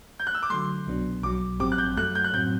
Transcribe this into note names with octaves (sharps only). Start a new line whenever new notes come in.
G6
F#6
E6
D6
D3 F#3 A3 C6
C2 B2 F#3 B3 D4
B1 B2 F#3 D6
A1 G2 F#3 C4 G4 D6
F#6
G6
F#2 F#3 A3 F#6
G6
F#6
A2 F#3 C4 G6